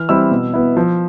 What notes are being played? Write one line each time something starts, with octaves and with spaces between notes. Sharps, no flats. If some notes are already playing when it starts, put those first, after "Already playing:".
Already playing: E3 F6
G3 C4 E4 E6
B2
B3 E4
F3